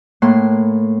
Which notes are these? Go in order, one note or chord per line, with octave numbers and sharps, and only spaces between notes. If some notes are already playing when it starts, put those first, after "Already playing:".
A2 A#3 C6 F#6